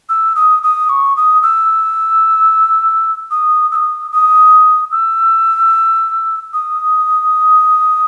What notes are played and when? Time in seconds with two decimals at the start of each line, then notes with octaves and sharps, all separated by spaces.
0.09 E6
0.36 D#6
0.63 D#6
0.89 C#6
1.17 D#6
1.43 E6
3.31 D#6
3.72 E6
3.76 D#6
4.12 D#6
4.92 E6
6.53 D#6